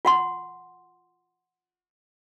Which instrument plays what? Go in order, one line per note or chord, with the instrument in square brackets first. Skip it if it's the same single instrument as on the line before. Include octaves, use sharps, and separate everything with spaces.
[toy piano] F4 F#5 C6